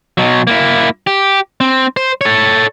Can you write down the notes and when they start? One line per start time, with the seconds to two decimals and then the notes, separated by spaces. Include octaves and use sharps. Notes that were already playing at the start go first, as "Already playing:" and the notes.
0.18 B2 F#3
0.47 A#3 E4
1.07 G4
1.60 C4
1.97 C5
2.21 A4 C#5